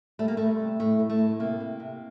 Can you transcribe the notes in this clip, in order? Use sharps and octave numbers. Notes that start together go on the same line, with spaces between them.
G3 A3
A#3
G3 A3
C3
A2 A3
A2
A3
A2
C3 A#3
C3
C3